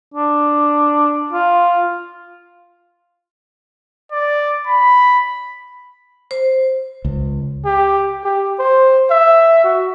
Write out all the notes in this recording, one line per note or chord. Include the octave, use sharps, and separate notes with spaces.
D4
F4
D5
B5
C5
C#2
G4
G4
C5
E5
F#4